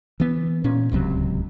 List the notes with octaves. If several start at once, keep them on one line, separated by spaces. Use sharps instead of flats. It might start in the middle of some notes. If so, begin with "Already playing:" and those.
E3 B3
A#2 C#4
D1 C#2 C3 F#3